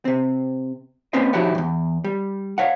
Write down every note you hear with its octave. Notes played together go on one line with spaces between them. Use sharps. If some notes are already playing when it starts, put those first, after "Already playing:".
C3 C4
A#3 C4 C#4 B4 C5 D#5
F3 D#4 E4 F#4 G4 C#5
E2 G2
G3
C#5 F5 F#5